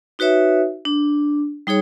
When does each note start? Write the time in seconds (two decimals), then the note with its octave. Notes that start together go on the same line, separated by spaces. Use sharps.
0.19 D#4 F#4 B4 C#5 E5
0.85 D4
1.67 G3 D#4 G#4 C#5